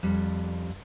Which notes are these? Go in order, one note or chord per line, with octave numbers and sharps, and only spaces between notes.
F2 G3